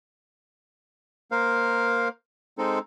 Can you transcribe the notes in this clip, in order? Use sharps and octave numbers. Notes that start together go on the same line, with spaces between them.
A#3 A#4 C5 F5
G#3 C4 D#4 A4